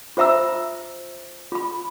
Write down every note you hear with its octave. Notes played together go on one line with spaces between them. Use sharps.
F4 C5 E5 A#5 E6
F4 B5